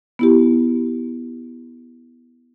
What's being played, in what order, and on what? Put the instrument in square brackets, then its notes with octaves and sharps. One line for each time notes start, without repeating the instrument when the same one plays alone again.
[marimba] B3 E4 G4